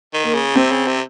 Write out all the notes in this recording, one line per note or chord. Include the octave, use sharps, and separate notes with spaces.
D#3
A#3
C#3
C3 C4
C#3
C3